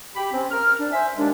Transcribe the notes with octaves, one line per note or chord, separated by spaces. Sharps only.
G4 B5
C4 C#4
A#4 F6
D4
C5 E5 G#5
D#2 G#3 D4